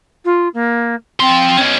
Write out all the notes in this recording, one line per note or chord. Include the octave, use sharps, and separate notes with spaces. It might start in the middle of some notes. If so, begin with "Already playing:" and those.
F4
A#3
F3 C4 C6
B2 C#4